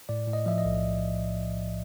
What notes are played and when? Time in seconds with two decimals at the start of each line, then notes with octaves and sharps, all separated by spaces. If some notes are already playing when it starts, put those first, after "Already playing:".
0.09 A2 D5
0.27 A2
0.33 D#5
0.46 F3 E5
0.58 D#5
0.65 B1